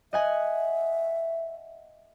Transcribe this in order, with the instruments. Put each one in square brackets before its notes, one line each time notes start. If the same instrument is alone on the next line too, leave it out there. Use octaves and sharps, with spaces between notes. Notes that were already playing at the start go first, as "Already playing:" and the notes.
[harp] D#5 F#5 G#5 [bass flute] E5